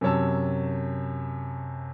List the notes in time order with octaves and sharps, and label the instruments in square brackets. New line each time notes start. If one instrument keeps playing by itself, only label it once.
[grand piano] F#2 C3 F#3 C#5 A5 E6